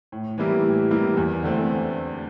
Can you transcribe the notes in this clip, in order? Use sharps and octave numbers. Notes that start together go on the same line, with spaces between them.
A2
E3 G3 A#3 E4
A2
E3 G3 A#3 E4
E2
D3 A3 C4